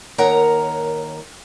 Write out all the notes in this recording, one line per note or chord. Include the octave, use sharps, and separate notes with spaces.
D#2 A#4 C#5 F#5 A#5